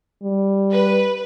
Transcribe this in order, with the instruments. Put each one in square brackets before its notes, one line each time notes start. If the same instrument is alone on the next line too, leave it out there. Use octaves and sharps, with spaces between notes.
[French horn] G3
[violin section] B4